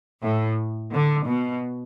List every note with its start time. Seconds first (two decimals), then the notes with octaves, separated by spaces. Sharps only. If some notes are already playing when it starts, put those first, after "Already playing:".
0.23 A2
0.93 D3
1.28 B2